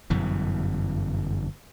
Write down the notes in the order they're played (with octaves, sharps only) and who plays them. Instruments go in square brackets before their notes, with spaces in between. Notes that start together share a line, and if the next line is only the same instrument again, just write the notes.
[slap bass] G1 F#2 B2 E3